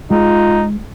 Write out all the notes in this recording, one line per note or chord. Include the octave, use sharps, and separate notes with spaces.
G#3 D#4 F4